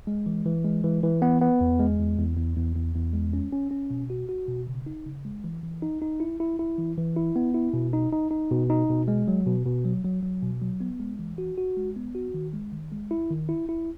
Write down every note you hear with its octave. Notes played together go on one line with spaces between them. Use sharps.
G#3
E3
E3
G#3
E3
E3
B3
B3
E2
G#3
E2
E2
E2
E2
E2
E2
G#3
C#4
C#4
C#4
B2
F#4
F#4
B2
C#3
D#4
C#3
G#3
E3
E3
D#4
D#4
E4
E4
E4
E3
E3
E4
B3
E4
B2
D#4
D#4
D#4
B2
D#4
B2
G#3
F#3
B2
B2
F#3
F#3
F#3
B2
F#3
B3
G#3
E3
F#4
F#4
G#3
B3
F#4
D#3
G#3
D#3
G#3
E4
D#3
E4
E4